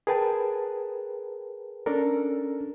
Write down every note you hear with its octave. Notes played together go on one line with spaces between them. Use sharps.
G#4 A#4 B4 G5 A5
C#4 D4 A4 A#4